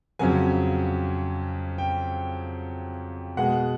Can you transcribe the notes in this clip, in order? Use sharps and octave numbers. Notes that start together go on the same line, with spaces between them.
F2 C#3 F#3 G#5
G5
B2 G#3 F#5